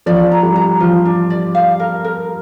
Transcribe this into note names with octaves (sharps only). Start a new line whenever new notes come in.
F3 D5
A#5
G3
A#5
F3 F4
D4
D5
F5
A#4
A#4